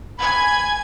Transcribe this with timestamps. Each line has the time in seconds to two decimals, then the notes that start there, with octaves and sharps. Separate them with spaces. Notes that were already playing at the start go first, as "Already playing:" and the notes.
0.18 G#5 B5 G#6